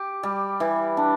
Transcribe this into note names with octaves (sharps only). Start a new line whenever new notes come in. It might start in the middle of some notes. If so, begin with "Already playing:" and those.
Already playing: G4
G3
E3
D4